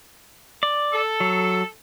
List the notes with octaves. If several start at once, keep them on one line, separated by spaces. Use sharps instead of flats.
D5
A4
F#3